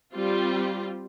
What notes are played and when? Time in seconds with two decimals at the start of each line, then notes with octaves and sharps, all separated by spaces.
0.15 G3 C4 F4